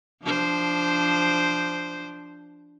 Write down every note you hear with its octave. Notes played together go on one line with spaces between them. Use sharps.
F3 D4 C5